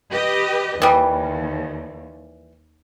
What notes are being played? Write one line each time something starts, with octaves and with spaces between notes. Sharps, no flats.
G4 B4 D#5
D#2 E3 G3